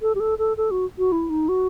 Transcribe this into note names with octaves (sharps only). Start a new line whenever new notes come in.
A4
G4
A4
A4
A4
F#4
F#4
E4
D#4
F#4